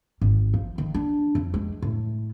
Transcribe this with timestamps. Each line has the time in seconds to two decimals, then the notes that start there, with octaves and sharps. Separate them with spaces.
0.21 G#1
0.54 F3
0.78 D#3
0.94 D4
1.35 F2
1.54 G#3
1.82 A2